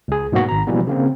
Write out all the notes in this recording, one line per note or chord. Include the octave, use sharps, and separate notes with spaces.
C#2 G#4
G#2 B2 F#3 A#3 B3 F#4
G#1 A#5
B2 E3 F3 G3 A#3 B3
C#3 A#3 C4